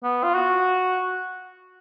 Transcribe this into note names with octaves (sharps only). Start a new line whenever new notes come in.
B3
F4
F#4